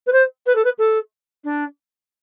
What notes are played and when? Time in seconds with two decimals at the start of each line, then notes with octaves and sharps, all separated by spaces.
0.07 B4
0.12 C5
0.46 B4
0.55 A4
0.64 B4
0.78 A4
1.44 D4